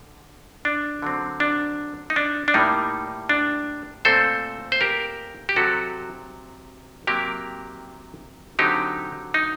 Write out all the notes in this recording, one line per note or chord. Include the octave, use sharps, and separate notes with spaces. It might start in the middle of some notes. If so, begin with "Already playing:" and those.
Already playing: D3
D4
D3 F#3 C4
D4
D#4
D4
D4
A2 G3 A#3 D#4
D4
A#2 A3 C4 A4 C5
C5
G4 A#4
G4
C3 F#3 C4 F#4 A4
C3 F#3 A#3 G4 A#4
D3 F#3 C4 D#4 G4
D#4